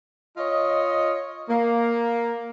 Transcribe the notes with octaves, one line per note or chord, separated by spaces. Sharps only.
F4 C#5 D#5
A#3